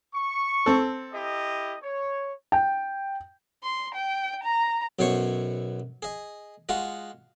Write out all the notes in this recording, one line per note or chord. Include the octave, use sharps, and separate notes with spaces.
C#6
C4 A4
E4 G4 D#5
C#5
G5
C6
G5
A#5
B1 F#2 B2 C5 C#5 C#6
G#4 D#5
G#3 F4 F#4 D#5